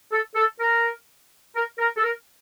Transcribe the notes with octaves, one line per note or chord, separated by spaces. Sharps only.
A4
A4
A#4
A#4
A#4
A4
A#4